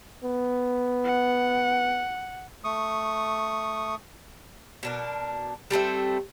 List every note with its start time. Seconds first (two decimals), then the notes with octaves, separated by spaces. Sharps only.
0.24 B3
1.04 F#5
2.64 A3 C#6 D#6
4.83 B2 D4 A#4
5.71 G3 A3 C4 E5